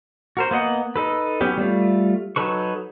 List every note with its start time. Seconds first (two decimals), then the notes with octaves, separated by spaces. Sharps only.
0.37 F#4 A#4 C5
0.51 A#3 B3 D#5 F#5
0.96 D#4 A4 B4
1.41 F#3 B3 C#4 G4
1.57 G3 A3 F4
2.36 F#3 D#4 A4 B4 C#6